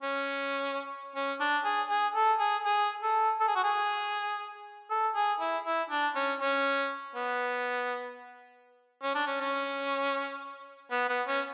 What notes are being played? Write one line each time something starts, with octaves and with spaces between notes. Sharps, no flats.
C#4
C#4
D4
G#4
G#4
A4
G#4
G#4
A4
A4
G#4
F#4
G#4
A4
G#4
E4
E4
D4
C#4
C#4
B3
C#4
D4
C#4
C#4
B3
B3
C#4